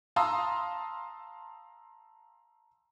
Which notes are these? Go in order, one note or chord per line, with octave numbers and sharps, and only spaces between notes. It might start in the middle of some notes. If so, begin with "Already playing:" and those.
F5 A5 A#5 C6 D#6 E6